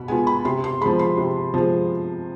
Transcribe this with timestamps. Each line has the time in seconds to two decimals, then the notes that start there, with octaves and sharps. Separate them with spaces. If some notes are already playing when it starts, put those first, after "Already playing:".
Already playing: B2 B5
0.08 G#3 B3 F4 G#5
0.27 B5
0.45 C3 C6
0.64 C6
0.81 G#3 B5
0.86 F3
0.99 C6
1.17 C3
1.54 F3 G#3